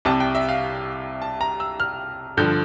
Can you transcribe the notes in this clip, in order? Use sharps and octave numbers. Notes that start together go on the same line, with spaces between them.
C2 C3 G3 A5
G5
E5
F5
A5
A#5
E6
F6
G2 D3 F3 G6